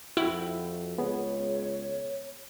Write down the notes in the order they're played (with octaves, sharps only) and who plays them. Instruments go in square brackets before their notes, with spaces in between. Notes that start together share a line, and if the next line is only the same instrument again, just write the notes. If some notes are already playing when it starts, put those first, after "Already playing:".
[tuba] F2 [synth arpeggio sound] E4 [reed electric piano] F#4 E5 G5
[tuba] C#2 [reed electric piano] B3 G#4 [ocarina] C#5